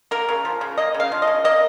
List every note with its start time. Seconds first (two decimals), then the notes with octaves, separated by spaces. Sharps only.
0.11 A#3 A#4
0.29 C#3
0.45 F3
0.61 C#3
0.78 A#3 D#5
0.94 C#3
1.00 F5
1.12 F3
1.22 D#5
1.27 C#3
1.44 A#3 D#5